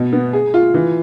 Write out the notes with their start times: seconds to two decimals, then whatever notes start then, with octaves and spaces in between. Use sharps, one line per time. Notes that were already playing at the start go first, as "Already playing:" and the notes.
Already playing: B2
0.13 B3
0.33 G#4
0.54 F4
0.74 E3